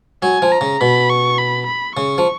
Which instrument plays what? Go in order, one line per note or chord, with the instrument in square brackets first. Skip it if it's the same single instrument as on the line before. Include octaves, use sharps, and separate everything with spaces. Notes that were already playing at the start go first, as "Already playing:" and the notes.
[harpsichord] F#3 [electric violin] G#5
[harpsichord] F3
[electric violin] A#5
[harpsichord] C#3
[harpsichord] B2 [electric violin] B5
[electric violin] C#6
B5
B5
[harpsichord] C#3 [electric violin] C#6
[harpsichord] F3